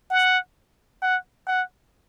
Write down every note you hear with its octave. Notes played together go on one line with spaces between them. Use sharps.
F#5
F#5
F#5